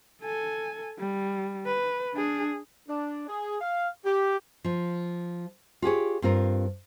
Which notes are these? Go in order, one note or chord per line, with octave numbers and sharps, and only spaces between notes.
A4 G#5
G3
B4
D4 G#4
D4
G#4
F5
G4
F3 F4
F4 G4 G#4 C#5
G2 C4 F4 A#4